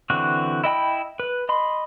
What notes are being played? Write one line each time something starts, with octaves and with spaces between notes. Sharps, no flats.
D3 E3 C4 F#4 F#6
E4 D#5 G5 B5
B4
D#5 B5 C6